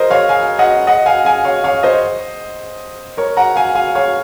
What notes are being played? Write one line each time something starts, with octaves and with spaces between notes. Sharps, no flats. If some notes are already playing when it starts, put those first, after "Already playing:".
Already playing: A#4 C5 D#5
C#5 F5
F5 G#5
D#5 F#5
D#5 F#5
F5 G#5
F5 G#5
C#5 F5
C#5 F5
C5 D#5
A#4 C#5
F#5 A#5
F5 G#5
F5 G#5
C#5 F5